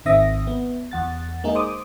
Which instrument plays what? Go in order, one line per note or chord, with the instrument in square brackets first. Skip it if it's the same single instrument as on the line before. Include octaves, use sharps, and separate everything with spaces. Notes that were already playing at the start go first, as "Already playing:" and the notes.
[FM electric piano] G#1 D#3 C4 E5 D#6 A#6
B3
E2 F#5 A6
G#3 A#3 D#4 G#4
C5 D6 D#6